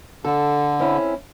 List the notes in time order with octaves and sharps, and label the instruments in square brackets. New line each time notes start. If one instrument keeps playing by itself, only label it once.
[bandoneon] D3 [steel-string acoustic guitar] A4
[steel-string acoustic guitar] C4 C#4 E4